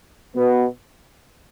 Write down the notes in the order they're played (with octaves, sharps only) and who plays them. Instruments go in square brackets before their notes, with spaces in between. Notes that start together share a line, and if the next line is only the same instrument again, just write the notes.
[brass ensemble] B2 B3